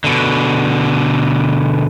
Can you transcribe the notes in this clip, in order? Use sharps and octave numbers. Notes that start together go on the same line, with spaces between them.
B2 D3